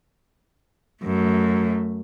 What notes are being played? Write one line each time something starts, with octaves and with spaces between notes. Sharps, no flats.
F#2 A3